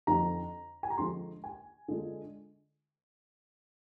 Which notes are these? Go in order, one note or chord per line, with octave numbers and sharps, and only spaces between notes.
F2 D3 F3 C4 D#4 A#5
G#5
A#5
D3 F3 G#3 C6
G#5
D3 G#3 D4 F4